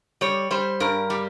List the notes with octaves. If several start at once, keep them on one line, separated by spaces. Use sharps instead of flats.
G3 C#5
G3 C5
G2 A#4
G3